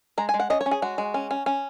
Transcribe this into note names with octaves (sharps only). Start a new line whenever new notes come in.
G#3 A#5
G#5
G#3
F#5
C#4 D#5
C#5
C#4
G#4
G#3 F#4
G#3
C#4
C#4
C#4